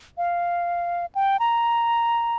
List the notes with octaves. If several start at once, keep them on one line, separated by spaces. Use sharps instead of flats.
F5
G5
A#5